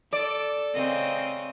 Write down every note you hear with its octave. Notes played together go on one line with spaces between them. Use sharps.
A4 D5
C#3 C4 D#5